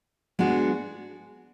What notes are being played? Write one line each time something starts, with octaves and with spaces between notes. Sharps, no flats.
G#3 B3 D4 F#4